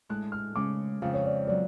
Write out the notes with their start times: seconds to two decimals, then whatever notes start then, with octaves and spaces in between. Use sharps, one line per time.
0.09 A2 G#3 D4 F#6
0.32 F6
0.56 C#3 G#3 C#4 D6
1.02 F2 C#3 G#3 F5
1.13 C#5
1.24 D5
1.47 F#3 B3 D5